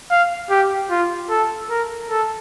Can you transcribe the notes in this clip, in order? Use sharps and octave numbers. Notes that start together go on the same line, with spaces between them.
F5
G4
F4
A4
A#4
A4